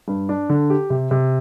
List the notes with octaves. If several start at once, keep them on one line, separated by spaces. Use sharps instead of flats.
G2
D4
D3
G4
C3
C3